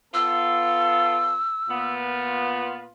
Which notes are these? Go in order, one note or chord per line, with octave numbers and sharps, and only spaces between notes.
B3 F4 A4 E6
A#2 B3 F4